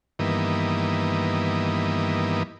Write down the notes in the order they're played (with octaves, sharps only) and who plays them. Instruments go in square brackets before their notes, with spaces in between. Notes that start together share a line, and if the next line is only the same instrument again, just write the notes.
[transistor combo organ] G2 D#3 E3 A#3 B3